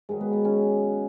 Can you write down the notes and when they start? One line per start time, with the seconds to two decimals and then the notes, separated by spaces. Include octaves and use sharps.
0.09 G#2 D#3 F#3 G#3
0.21 B3
0.33 B3
0.45 C#4